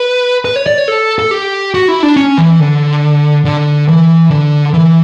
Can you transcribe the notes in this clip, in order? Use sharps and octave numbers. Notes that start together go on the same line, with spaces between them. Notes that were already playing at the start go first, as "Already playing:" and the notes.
Already playing: B4
B4
C#5
D5
C#5
A4
A4
G4
F#4
E4
D4
C#4
E3
D3
D3
E3
D3
E3